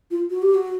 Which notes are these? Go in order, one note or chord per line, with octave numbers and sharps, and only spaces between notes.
F4
F#4
G4
F#4